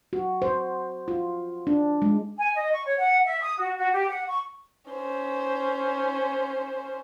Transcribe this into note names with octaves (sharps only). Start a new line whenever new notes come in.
F#4
C5
F4
D4
G#3
G#5
D#5
C#6
C#5
F#5
E5
D#6
F#4
F#4
G4
F#5
C#6
C#4 C5